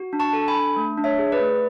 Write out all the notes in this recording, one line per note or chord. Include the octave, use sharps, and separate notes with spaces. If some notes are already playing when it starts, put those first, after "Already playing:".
Already playing: F#4
D4
A5 C#6
A4
G#5 B5
D4
A3
D4
C#5 E5
G#4
B4 D5
A3